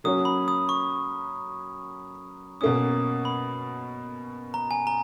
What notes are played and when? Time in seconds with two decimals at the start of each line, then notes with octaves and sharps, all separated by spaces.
0.04 F#3 A#3 C#4 F#4 C#5 D#6
0.25 B5
0.48 D#6
0.69 C#6
2.61 B2 A#3 C#4 D#6
3.25 B5
4.54 A#5
4.71 G#5
4.87 A#5